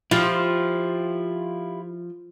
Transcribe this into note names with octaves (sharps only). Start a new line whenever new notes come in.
F3 E4 F4 G4